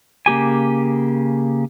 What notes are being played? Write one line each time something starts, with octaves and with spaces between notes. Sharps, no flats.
C#3 A#3 G4 G#5